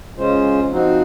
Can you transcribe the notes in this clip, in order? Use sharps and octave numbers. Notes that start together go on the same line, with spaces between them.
C#3 G#3 C#4 F4 C5
F3 C4 D#4 F#4